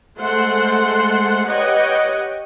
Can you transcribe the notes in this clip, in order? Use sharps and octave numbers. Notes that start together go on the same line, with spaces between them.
G#3 A3 C5 F#5 C6
G4 B4 C#5 D#5 F#5 G5